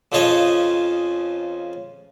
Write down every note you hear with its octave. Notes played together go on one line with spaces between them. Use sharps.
F2 C#3 F3 C#5 D#5